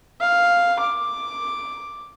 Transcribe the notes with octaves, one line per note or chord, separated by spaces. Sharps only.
F5
D6